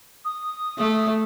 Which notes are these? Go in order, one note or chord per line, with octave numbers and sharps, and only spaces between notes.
D#6
A3